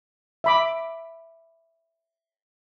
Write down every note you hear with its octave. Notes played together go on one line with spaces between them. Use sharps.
E5 B5 D6